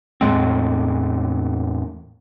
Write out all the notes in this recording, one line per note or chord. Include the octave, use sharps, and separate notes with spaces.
E2 A2 G#3 C4